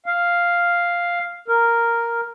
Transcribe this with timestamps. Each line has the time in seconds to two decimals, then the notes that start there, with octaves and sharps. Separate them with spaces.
0.06 F5
1.48 A#4